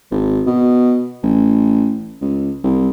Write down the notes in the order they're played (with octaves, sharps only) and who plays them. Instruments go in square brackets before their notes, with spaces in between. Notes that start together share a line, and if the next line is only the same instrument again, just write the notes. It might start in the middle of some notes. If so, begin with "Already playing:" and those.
[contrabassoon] G#1
B2
A1
C#2
C2